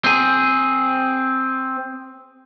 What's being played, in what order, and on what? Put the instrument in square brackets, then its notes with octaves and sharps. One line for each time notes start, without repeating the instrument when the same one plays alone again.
[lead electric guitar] C4 G#4